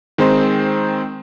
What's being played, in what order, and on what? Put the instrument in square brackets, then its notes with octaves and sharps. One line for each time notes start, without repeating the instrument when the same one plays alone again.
[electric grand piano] D#3 G#3 C4 D#4 C5